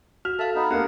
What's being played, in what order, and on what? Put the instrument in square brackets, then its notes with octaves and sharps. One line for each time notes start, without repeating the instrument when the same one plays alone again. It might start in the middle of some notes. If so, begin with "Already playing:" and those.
[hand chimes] F#4 [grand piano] F6
[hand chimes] A4 F5 [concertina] E5 A5
[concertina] B3 D#4
[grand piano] A#3 A#4 [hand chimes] B3 D4 G4 [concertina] F5 F#5